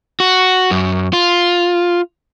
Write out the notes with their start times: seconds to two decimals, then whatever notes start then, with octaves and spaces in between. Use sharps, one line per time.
0.20 F#4
0.71 F#2
1.13 F4